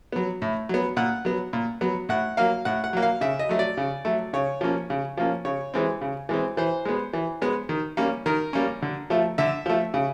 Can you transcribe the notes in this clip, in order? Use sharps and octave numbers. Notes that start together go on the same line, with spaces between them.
F#3 B3
A2
F#3 B3
A#2 F#5
F#3 B3
A#2
F#3 B3
A2 F#5
F#3 A#3 F5
A2 F#5
F#5
F#3 A#3
F5
C#3 E5
D#5
F#3 A3
D5
C#3
F#3 A3
C#3 C#5
F3 A#3 C#4
C#3
F3 A#3 C#4
C#3 C#5
E3 G#3 C4
C#3
E3 G#3 C4
E3 C5
G#3 B3
E3
G#3 B3
D#3
G3 A#3 C#4
D#3 A#4
G3 A#3 C#4
D3
F3 A3
D3 E5
F3 A3
C#3